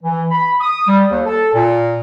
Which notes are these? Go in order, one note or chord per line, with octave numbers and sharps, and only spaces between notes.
E3
B5
D#6
G3
D#2
A4
A#2